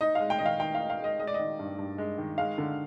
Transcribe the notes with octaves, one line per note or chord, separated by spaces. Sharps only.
D#4 D#5
G#3 F5
G5
D#3 D#5
F5
D#3 G5
D#4 F5
F5
G#3 D#5
G#3 D#5
D5
D#3 D#5
G2
G2
G#3
D#3
G#3 F5
D3